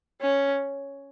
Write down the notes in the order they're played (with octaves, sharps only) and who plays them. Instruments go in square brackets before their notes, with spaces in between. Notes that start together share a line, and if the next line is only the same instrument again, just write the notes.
[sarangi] C#4